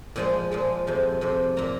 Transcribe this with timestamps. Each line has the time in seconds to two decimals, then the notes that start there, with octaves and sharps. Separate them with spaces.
0.16 A#2 F3 G#3 G#5
0.52 A#2 F3 G#3
0.87 F2 C3 F3
1.21 F2 C3 F3
1.57 A#2 A#3 A#5